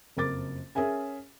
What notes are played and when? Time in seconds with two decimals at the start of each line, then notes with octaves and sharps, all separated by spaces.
0.17 F#1 F2 A#4 D6 A6
0.75 C#4 G#4 A#4 E5 G#5